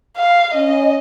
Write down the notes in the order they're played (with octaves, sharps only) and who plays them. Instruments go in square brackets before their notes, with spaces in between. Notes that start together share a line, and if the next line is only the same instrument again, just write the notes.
[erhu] F5
[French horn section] C#4 [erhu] D#5